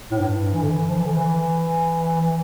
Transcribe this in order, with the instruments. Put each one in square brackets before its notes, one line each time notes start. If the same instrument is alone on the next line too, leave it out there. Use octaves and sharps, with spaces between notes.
[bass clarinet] A2
G2
E3
D3
E3
F3
E3
D3
E3
E3